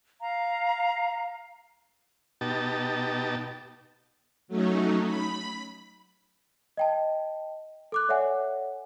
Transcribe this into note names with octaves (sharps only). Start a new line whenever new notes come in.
F5 A#5
B2 D#4 G4 A5
F#3 A3 C#4 D#4
B5
D#5 G5 A5
A4 D6 F#6
A4 C#5 D5 E5 F#5 G#5